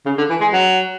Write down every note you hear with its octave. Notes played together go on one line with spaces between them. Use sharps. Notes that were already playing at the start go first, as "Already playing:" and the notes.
C#3
D3
E3
G#3
F#3